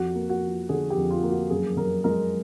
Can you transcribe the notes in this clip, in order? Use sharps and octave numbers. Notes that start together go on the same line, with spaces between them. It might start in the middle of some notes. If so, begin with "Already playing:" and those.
Already playing: F2 F#4
A#3
F#4
F3
D3 G#4
G4
F2
F4
A#3
F#4
F#2 G#4
F#2 A#4
G#3 A#4